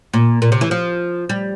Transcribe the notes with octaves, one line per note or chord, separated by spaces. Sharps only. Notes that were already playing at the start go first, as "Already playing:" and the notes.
A#2
A#2
C3
E3
F3
G3